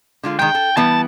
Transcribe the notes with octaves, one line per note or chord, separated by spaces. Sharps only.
D3 G#3 F4
D#3 G#3 G5
A4
E3 G3 B3 A5